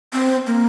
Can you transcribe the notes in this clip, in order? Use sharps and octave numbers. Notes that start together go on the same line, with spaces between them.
C4
A#3